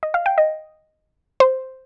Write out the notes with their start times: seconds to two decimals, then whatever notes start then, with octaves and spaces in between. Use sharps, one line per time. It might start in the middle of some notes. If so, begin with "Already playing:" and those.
0.03 D#5
0.14 F5
0.26 G5
0.38 D#5
1.40 C5